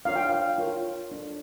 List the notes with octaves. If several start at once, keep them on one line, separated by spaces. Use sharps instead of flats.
D4 F4 C#5 F5
G5
F5
F4 A#4 C#5
D4 A4 C#5